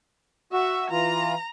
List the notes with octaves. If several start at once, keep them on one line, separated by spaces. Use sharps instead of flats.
F#4 E5
E3 F4 A#5